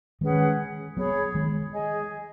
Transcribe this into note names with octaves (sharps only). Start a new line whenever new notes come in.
D#3 G#3 C#4 G#4 B4 F#5
F#3 B3 G#4 C#5 B5
D#3 G#3
G#4 D#5 G#5